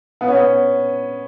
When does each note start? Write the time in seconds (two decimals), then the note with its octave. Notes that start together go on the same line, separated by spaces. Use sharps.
0.21 B3
0.28 C#4
0.34 B3